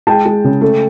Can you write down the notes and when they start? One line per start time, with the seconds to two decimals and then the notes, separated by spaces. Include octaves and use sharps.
0.07 G#3 G5 A5
0.26 G#3
0.44 C#3
0.61 A3